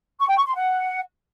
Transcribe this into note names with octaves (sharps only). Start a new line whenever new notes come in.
C#6
G5
C#6
C6
F#5